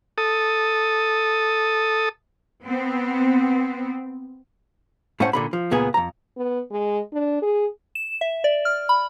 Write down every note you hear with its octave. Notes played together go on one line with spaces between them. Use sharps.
A4 D#6
B3 C4
A2 A3 C#4 C5 F#5
A#2 D3 B5
F3
C#2 A#2 B3 G#4
F2 A#5
B3
G#3
D4
G#4
E7
E5
D5
F6
B5